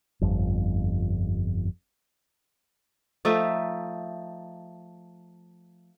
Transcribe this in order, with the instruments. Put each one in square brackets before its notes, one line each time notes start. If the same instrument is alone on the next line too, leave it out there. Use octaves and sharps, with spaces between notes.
[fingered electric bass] G1 F2
[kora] F3 A3 D#4 E5